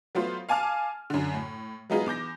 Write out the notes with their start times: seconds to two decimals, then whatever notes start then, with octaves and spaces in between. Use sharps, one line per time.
0.15 F#3 A3 B3 F4 C5
0.49 F5 G#5 A5 D6 F6
1.10 F#2 D3
1.34 A2
1.90 F#3 G#3 B3 D#4 F4 G#4
2.06 E2 D6 G6 A#6